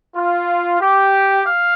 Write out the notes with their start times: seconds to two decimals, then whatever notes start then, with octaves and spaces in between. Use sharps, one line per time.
0.15 F4
0.80 G4
1.44 F5